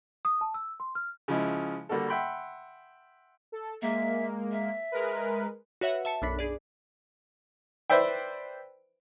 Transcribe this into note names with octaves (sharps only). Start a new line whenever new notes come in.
D#6
A5
E6
C6
F6
C#3 F3 G#3 E4
D3 G3 A#3 F#4 A4
E5 F#5 G5 B5 C6
A4
G#3 A#3 E5
E5
G#3 A#4 B4
F#4 B4 C#5 E5 F#5
E5 A5 C#7
B1 F#2 D4 B5 B6
G#4 D5
B4 C5 D5 E5 G5